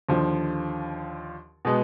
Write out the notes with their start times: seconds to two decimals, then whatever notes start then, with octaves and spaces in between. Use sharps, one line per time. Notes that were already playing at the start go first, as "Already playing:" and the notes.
0.09 D#2 D3 F3
1.65 B2 G#3 B3